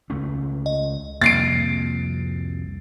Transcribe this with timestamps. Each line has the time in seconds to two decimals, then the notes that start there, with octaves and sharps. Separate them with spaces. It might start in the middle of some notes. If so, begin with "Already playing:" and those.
0.10 C#2 A3 C#4
0.66 D#5
1.21 C2 F2 A#3 A6 C7 D7